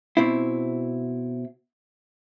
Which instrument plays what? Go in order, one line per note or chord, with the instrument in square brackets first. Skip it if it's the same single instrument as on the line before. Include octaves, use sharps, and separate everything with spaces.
[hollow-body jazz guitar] B2 C4 E4